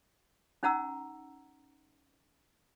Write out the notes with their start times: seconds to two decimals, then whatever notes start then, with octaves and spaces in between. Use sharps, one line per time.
0.63 C#4 D#4 F#5 A#5 E6